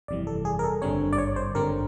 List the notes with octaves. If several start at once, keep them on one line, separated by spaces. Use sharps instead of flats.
G1 F2 C3 E3 G3 D5
A4
G#4
A#4
A4
G#1 G2 D3 G3 C4 C#5
D5
C#5
C5
G#1 G2 D3 G3 C4 A#4